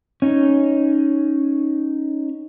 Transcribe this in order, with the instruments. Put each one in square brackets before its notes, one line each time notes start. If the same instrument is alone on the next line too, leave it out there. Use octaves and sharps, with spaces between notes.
[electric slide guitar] C#4 D#4